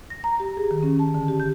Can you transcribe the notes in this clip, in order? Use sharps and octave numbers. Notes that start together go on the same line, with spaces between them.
A#6
A#5
G4
G#4
D#3
C#4
A5
D3
G4
G6